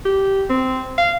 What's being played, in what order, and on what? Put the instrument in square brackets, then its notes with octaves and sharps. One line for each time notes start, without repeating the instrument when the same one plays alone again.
[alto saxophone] G4
C4
F5